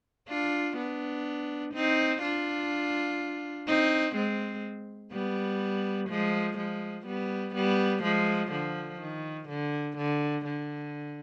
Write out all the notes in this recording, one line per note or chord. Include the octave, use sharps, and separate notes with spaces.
D4 F4
B3 D4
C4 D#4
D4 F4
C4 D#4
G#3 C4
G3 B3
F3 G#3
F3 G#3
G3 B3
G3 B3
F3 G#3
D3 F3
D#3
D3
D3
D3